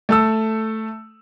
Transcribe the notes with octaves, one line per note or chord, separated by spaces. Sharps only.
A3 A4 E6